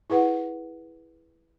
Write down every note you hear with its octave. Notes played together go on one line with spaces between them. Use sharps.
E4 G#4 B4 F#5